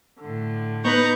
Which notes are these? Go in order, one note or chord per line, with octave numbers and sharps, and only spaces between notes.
A2 D3
B3 D#4 B4 A#5 C#6 G6